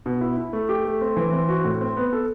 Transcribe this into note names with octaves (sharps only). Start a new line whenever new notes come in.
B2
E4
E4
A3
G4
A3
C4
E3
C4
F#4
A2
C4
B3
A4